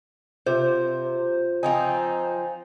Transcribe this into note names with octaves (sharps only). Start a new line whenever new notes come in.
C3 F4 C5
F3 C4 D#4 G#5